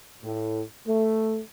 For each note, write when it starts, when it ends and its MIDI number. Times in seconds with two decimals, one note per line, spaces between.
0.23 0.62 45
0.87 1.41 57